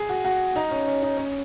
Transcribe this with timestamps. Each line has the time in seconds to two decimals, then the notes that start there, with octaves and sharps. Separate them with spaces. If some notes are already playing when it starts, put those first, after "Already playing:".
Already playing: G#4
0.09 F#4
0.25 F#4
0.56 D#4
0.71 C#4
0.87 C#4
1.02 D#4
1.17 C#4